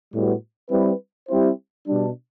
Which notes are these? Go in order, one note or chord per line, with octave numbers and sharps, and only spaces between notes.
A2 G3 B3 F#4
G3 C4 E4 B4
G3 C4 E4 G4 C5
B2 G3 D4